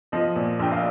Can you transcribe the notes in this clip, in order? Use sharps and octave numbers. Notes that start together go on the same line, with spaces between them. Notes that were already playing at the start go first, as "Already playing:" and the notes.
F3 D#5
A#2
A#1 G5
F5